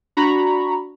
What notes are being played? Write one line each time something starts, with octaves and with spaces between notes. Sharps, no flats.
D4 F#4 A#5 B5 C#6